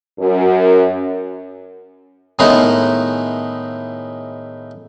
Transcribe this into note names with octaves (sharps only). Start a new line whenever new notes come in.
F#2
A2 D#3 G#3 B3 D#4 E4